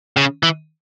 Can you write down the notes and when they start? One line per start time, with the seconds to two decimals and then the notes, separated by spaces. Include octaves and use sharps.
0.17 C#3
0.43 E3